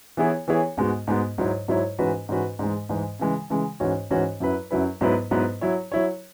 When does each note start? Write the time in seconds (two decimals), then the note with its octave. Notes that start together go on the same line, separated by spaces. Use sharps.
0.17 E3 B3 E4 G#4 C#5
0.48 E3 B3 E4 G#4 C#5
0.77 G#2 G#3 B3 F#4
1.07 G#2 G#3 B3 F#4
1.38 G#2 F#3 E4 C#5
1.68 G#2 F#3 E4 C#5
1.99 G#2 E3 C#4 F#4 B4
2.29 G#2 E3 C#4 F#4 B4
2.59 G#2 E3 G#3
2.89 G#2 E3 G#3
3.19 C#3 E3 G#3
3.50 C#3 E3 G#3
3.80 G#2 E3 C#4 F#4 C#5
4.10 G#2 E3 C#4 F#4 C#5
4.40 F#2 F#3 E4 B4
4.71 F#2 F#3 E4 B4
5.01 G#2 F#3 B3 E4 B4
5.31 G#2 F#3 B3 E4 B4
5.61 F#3 E4 C#5
5.92 F#3 E4 C#5